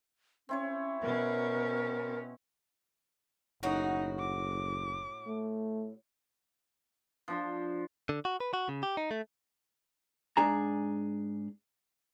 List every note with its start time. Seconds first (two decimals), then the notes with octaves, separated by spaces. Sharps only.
0.49 C4 C#4 E4 C#5
1.02 B2 C#4 A#4
3.63 F#1 A2 D#4 F#4
4.20 D6
5.27 A3
7.28 F3 D4 C5
8.09 D3
8.25 F#4
8.40 B4
8.54 F#4
8.69 C#3
8.83 G4
8.97 D#4
9.11 A3
10.37 G#2 D4 G#4 A#5